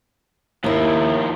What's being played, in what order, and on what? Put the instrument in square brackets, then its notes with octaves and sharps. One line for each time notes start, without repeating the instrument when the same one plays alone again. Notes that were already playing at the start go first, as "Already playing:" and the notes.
[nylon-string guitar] D#2 E4 [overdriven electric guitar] D#3 F3